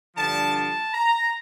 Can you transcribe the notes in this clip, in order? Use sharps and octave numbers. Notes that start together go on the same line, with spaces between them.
G2 D3 F3 A5
A5
A#5